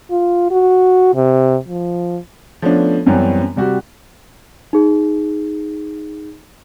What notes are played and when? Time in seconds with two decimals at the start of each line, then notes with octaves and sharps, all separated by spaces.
0.11 F4
0.51 F#4
1.15 C3
1.68 F3
2.62 F3 A3 B3 C#4 D4
3.06 F#2 E3 F#3 G3 B3 C4
3.56 C3 G3 F#4 G4
4.73 D#4 G#4